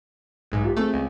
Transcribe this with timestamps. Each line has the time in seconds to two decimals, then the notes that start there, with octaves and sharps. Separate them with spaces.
0.52 B1 G#2
0.65 F4 G4
0.77 A3 C4 G#4
0.94 C#2